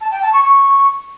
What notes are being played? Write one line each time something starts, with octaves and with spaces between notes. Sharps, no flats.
A5
G5
A5
C#6
C#6